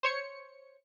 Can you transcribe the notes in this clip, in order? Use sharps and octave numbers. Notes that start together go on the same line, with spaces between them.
C5 C#5 C#7